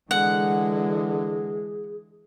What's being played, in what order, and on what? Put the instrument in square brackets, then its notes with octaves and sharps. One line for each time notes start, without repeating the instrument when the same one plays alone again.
[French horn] D3 [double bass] E3 G#3 [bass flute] G#4 [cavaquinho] F#5